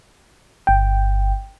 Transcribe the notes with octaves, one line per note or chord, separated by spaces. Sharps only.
G1 G5